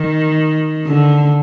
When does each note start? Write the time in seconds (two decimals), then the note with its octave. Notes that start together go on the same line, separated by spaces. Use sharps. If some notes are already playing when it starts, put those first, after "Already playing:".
Already playing: D#3
0.87 D3